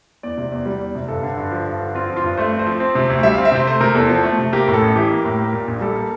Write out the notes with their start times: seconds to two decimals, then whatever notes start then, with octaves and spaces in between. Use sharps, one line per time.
0.23 E2 D5
0.38 C3
0.52 E2
0.66 G3
0.80 E2
0.95 C3
1.08 G2 A4
1.23 D3
1.37 G2
1.51 F3
1.67 G2
1.81 D3
1.95 C4 F4
2.10 F3
2.17 F4
2.24 G2
2.37 A3 C5
2.53 C4
2.59 C5
2.66 F3
2.80 C4
2.95 C3
3.10 D2
3.23 G3 E5
3.34 C4 F5
3.45 E5
3.52 C3 C5
3.67 A3 C5
3.80 C3 A#4
3.95 E2 A4
4.09 F3
4.24 A3
4.38 C3
4.53 A#3 G4
4.68 A2
4.74 A4
4.82 A1
4.96 E3 G4
5.11 A#3
5.25 A2
5.39 A#3
5.53 A#2
5.68 A#1
5.81 G3 A4
5.95 A#3